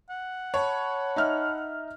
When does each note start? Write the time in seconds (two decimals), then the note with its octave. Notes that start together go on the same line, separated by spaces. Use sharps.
0.10 F#5
0.54 C#5 A5 B5
1.16 D#4 E5 F6